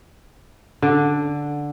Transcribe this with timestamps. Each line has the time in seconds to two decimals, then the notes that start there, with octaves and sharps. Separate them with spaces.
0.82 D3